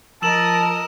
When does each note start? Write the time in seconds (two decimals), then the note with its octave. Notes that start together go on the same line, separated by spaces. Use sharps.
0.22 F3 A#4 D#5 A5 E6 E7 F#7